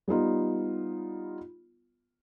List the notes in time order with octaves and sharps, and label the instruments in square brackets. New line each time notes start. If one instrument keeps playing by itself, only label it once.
[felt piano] G3 B3 D#4 F4